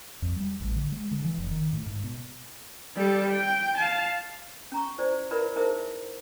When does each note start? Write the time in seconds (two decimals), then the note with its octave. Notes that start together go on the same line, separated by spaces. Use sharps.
0.22 F2
0.36 G3
0.60 A1
0.76 D3
0.92 G#3
1.11 D3
1.24 E3
1.38 F1
1.51 D#3
1.73 A2
1.86 G#2
2.04 B2
2.96 G3 A4
3.30 G5
3.77 F5 A5
4.72 C#4 A#5 C#6
4.98 E4 C5 D5
5.31 E4 A#4 B4 D5 E5 B5
5.56 D#4 E4 G#4 A#4 C5 E5